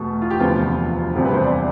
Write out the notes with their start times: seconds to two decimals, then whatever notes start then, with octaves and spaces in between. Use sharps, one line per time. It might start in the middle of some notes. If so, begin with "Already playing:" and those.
Already playing: E2 B2 A3
0.22 F4
0.30 G4
0.40 E1 D2 C3 F3 B3 F4
1.15 E1 D2 C3 G3 C4 G4
1.25 B4
1.34 C5
1.43 D5